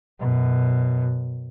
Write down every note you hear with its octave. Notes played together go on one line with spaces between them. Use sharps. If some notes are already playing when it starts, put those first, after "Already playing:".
F#2 B2